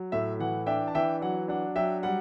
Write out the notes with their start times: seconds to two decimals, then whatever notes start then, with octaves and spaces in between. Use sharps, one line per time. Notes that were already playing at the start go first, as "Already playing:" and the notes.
Already playing: F#3
0.12 A2 E5
0.39 E3 F#5
0.66 D4 E5 G5
0.88 A5
0.95 E3 E5 G5
1.21 F#3 F#5
1.48 D4 F#5
1.76 F#3 E5 G5
2.03 G3 F#5